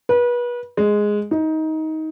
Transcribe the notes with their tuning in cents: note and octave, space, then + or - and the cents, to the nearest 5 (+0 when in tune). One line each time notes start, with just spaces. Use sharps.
B4 -30
G#3 +0
D#4 +20